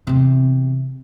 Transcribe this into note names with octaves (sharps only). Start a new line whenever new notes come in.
E2 C3